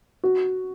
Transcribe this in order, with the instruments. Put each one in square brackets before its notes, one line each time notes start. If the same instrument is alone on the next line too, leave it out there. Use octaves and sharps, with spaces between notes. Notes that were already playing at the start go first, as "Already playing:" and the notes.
[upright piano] F#4